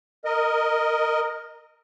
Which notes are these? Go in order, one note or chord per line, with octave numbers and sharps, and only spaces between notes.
A#4 D#5